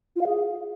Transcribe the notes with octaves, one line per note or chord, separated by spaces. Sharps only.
F4
F5
G#4